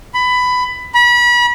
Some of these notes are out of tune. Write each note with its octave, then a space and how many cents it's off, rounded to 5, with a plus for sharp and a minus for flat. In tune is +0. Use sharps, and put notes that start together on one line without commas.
B5 +15
B5 -35